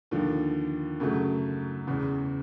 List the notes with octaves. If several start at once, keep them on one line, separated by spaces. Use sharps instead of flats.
D#2 D3 F3
F#2 C#3 F#3 A3
E2 C#3 E3